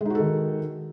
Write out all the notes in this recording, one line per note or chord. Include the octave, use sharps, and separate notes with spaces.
D#3 G#3 D#4 F#4 A4